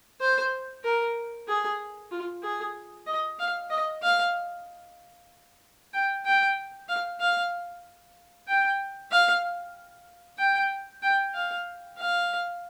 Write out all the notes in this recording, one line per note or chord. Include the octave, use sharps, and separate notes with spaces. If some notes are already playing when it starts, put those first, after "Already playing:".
C5
A#4
G#4
F4
G#4
D#5
F5
D#5
F5
G5
G5
F5
F5
G5
F5
G5
G5
F5
F5